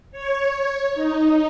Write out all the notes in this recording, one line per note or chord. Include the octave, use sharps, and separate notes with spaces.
C#5
D#4